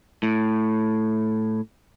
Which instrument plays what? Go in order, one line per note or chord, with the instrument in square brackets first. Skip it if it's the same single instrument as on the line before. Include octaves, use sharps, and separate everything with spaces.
[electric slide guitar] A2